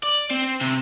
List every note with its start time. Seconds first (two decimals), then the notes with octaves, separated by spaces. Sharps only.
0.03 D5
0.30 C4
0.61 C3